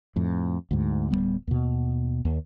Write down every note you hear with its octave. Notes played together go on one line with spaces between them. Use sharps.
F2 A2
D2 G#2
D1 E2 G3 B3
D#2 B2
D#2